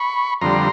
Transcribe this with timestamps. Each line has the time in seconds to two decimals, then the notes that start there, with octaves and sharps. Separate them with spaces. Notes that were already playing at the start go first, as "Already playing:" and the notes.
Already playing: B5 C#6
0.41 F2 D3 G3 A#5 C6